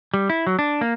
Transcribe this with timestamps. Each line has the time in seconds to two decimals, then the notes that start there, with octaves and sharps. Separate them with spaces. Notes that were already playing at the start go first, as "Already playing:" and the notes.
0.14 G3
0.30 E4
0.47 F#3
0.59 D4
0.81 A#3